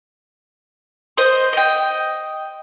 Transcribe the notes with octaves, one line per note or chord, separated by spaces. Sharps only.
C5 D#5 D#6
D#5 G5